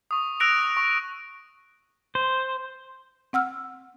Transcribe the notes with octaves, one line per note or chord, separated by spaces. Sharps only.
C#6 D#6
E6 F#6 A#6 D7 F7
C#6
C5
C4 F#5 E6 F6